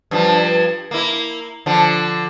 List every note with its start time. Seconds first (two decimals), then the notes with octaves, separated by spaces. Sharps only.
0.11 G2 F3
0.91 A#3 E4
1.66 D3 F3